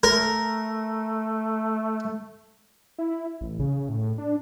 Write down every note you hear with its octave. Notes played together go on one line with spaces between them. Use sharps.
A3 A#4
E4
A1
C#3
A2
D4